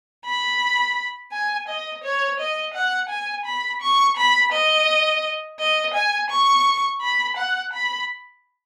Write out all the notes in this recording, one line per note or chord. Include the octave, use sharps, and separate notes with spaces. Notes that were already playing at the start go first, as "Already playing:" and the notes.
B5
G#5
D#5
C#5
D#5
F#5
G#5
B5
C#6
B5
D#5
D#5
G#5
C#6
B5
F#5
B5